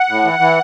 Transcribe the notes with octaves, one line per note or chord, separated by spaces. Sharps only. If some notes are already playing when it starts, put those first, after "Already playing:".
Already playing: F#5
A2
E3
E3